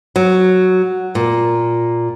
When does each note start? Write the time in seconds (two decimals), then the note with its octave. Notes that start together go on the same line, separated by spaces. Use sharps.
0.16 F#3
1.15 A#2